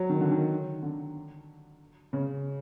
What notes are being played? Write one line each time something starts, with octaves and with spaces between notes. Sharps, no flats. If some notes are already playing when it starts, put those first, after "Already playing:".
Already playing: F#3
D#3
D3
D#3
D3
C#3